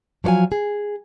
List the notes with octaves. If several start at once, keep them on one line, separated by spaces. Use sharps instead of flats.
F3 F#3 C#5 F5 G#5
G#4